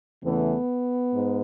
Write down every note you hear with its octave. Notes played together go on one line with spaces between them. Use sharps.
E2 C#3 E3 A3 B3
G#2